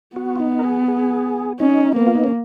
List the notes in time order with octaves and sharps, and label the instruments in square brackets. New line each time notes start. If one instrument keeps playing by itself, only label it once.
[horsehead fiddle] B3 [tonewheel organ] F#4
[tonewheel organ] F4
D#4
A#4
G#4
G#4
[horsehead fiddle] C#4 [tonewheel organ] D#4
[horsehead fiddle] A#3 [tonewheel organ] B3
[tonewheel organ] F4
D#4
C#4